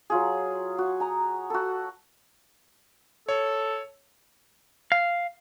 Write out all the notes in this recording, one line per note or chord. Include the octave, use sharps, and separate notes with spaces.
F#3 F4 G#4
F#4
G#5 A#5 D#6
F#4 A4
A4 C#5
F5